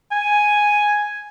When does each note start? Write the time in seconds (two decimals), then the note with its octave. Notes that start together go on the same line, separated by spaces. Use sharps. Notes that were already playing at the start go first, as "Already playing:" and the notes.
0.12 G#5